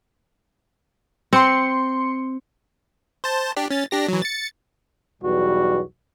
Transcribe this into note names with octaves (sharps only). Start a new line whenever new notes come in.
C4 C6 C#7
C5 A5
D4 G4
C#4 A6
D4 G4 A#6
E3 F#3
A6 C#7
B1 E2 B2 G3 F#4